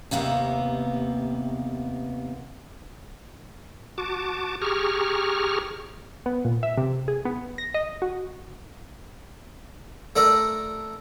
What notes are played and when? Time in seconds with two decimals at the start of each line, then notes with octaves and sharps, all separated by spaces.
0.11 D#2 C3 A#3 B3 F4 E5
3.98 F#4 A5 D6
4.61 G4 G#4 A#5 C#6 F6
6.26 B3
6.45 A#2
6.63 E5
6.77 C3
7.08 G#4
7.25 B3
7.58 A#6
7.74 D#5
8.02 F#4
10.16 A3 D4 A#4 E5